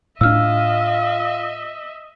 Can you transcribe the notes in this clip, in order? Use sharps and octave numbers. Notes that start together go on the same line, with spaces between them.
A2 D4 F4 D#5 E5 E6 F6